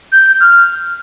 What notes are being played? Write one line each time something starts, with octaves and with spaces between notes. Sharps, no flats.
G6
F6